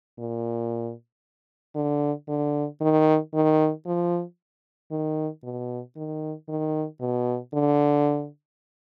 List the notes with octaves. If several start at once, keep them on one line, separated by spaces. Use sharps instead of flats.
A#2
D3
D3
D#3
D#3
F3
D#3
B2
D#3
D#3
B2
D3